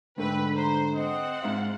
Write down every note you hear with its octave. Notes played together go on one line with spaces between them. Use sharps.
G#2 D3 A3 C4 B4
C5 A#5
C4 C5 D#5 F#5
G#2 F4 E5